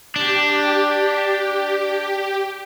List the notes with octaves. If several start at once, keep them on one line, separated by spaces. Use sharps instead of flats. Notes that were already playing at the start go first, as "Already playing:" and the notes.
D4 G4